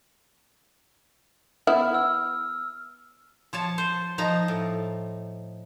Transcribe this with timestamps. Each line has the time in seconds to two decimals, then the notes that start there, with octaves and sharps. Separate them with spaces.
1.67 B3 E4 E5 F6
1.94 E6
3.53 F3 C#5 A5
3.78 C5
4.18 F3 D#4 A#5
4.48 A2